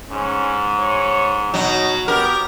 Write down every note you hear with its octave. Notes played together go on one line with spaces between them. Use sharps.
G#2 C#4
C#5
B2 F#3 D#4
B3 G4 A#4